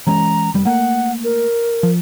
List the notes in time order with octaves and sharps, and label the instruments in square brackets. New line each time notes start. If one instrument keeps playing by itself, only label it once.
[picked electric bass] E3 G#3 C#4 [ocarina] A#5
[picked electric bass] F1 G3
[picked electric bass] A3 A#3 [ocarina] F#5
[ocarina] A#4
[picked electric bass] F3